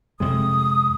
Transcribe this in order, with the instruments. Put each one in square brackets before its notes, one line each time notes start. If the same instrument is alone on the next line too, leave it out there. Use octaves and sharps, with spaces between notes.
[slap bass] F2 C3 G#3 [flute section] D#6